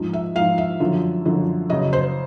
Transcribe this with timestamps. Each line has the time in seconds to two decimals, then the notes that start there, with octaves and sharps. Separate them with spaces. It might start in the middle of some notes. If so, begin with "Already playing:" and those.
Already playing: G#2 F3
0.13 E5
0.35 G#2 F3 F5
0.58 E5
0.80 F#2 D3 F3
1.25 F#2 D3 F3
1.70 F#2 C#3 F#3 D#5
1.93 C5